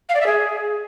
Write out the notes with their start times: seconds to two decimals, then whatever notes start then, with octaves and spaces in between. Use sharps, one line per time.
0.09 F5
0.15 D5
0.21 E5
0.27 G#4